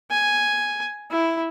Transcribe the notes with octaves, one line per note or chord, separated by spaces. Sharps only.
G#5
E4